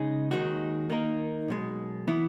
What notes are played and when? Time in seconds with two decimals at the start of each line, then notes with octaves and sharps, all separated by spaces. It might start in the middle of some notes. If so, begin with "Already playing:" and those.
Already playing: C#3 G#3 D#4 G#4
0.31 D#2 D#3 G#3 D#4 F#4
0.90 D#3 A#3 D#4 A#4
1.48 B1 B2 G#3
2.07 E3 B3 E4